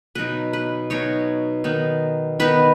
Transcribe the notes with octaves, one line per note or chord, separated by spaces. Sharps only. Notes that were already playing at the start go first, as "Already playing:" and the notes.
B2 F#3 D#4 B4
B4
B2 F#3 D#4 C#5
D#3 B3 D#4
D#3 B3 D#4 B4